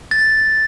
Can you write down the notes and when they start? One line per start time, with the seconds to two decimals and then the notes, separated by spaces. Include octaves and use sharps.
0.11 A6